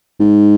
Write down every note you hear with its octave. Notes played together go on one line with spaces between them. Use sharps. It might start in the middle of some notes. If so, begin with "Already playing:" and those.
G#2